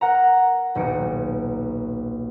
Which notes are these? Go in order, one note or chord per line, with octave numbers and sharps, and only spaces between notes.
A#4 F#5 A#5
D#1 B1 C#7 D7